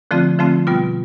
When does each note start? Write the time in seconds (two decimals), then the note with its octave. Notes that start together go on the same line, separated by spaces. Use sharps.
0.11 D3 F3 A3 C4 F4
0.39 D3 F3 A3 C4 F4
0.67 B2 G3 B3 F4